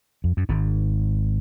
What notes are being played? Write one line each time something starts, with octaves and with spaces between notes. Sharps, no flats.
F2
F#2
G#1 G#2